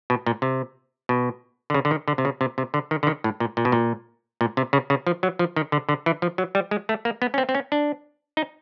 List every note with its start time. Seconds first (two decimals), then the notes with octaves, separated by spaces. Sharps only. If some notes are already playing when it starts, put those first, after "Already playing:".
0.10 B2
0.26 A#2
0.42 C3
1.09 B2
1.70 D3
1.74 C#3
1.85 D3
1.91 D#3
2.08 D3
2.18 C3
2.25 C#3
2.41 C3
2.58 C3
2.74 D3
2.91 D#3
3.03 D3
3.07 D#3
3.24 A2
3.40 A#2
3.57 A#2
3.65 B2
3.72 A#2
4.41 A#2
4.57 C3
4.73 C#3
4.90 C#3
5.07 F3
5.23 F#3
5.39 F3
5.56 D#3
5.72 D3
5.89 D3
6.06 E3
6.22 F3
6.38 F#3
6.55 G3
6.71 G#3
6.89 A3
7.05 A#3
7.22 B3
7.34 C#4
7.38 C4
7.49 C4
7.55 C#4
7.72 D4
8.37 D#4